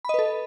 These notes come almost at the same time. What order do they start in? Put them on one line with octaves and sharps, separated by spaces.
B5 D#5 B4 A4